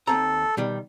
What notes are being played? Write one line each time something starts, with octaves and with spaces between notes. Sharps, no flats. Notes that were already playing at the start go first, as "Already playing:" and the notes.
D#2 C4 A4 A#5
B2 D#3 G3